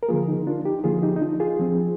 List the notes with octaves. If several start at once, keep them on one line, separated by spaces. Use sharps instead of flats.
A#4
D3 F3 A#3 F4 G#4
D#4
D4 F4
D#4 G4
D3 F3 A#3 F4 G#4
D#4 G4
D#4
D4 F4
F4 G#4
F3 C4